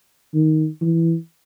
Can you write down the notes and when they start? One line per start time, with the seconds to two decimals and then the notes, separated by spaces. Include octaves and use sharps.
0.34 D#3
0.81 E3